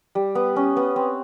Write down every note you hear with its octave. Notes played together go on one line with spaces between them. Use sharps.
G3
B3
C#4
B3
C4